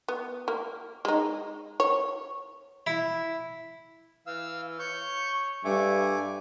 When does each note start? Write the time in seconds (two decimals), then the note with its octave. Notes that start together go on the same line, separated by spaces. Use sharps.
0.08 B3
0.48 A#3
1.05 G#3 D#4
1.80 C#5
2.87 E4
4.27 E3 F5 E6
4.79 C#5 C#6 G6
5.65 G2 A3 G#5 D6